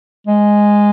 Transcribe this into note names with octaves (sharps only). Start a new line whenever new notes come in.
G#3